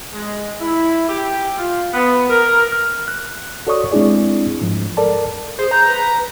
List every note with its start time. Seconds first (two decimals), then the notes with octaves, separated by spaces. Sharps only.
0.14 G#3
0.60 E4
1.09 G4
1.58 F4
1.94 B3
2.29 A#4
2.72 F6
3.08 F#6
3.67 F#4 A4 C#5 D5 C#6 D#6
3.92 G#3 C4 D4 E4 G#4 D5
4.61 G#2 F3
4.97 A4 A#4 D5 A5
5.59 G#4 C5
5.71 A#5 G6
5.87 B4